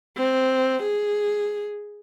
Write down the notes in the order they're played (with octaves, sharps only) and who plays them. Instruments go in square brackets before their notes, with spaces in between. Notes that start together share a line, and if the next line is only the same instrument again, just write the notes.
[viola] C4
G#4